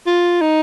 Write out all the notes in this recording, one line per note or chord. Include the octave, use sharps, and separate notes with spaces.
F4
D#4